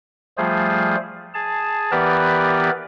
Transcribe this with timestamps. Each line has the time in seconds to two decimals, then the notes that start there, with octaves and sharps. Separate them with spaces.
0.38 F3 G3 A3 F4 G#4 C5
1.34 G#4 A5
1.92 E3 B3 G4 A#4 B4 D5